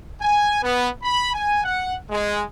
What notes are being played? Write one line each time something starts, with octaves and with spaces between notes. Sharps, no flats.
G#5
B3
B5
G#5
F#5
G#3